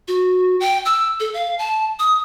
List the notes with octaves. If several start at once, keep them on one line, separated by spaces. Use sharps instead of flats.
F#4
G5
E6
A4
F5
A5
D#6